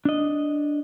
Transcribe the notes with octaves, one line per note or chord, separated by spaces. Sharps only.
D4 D#5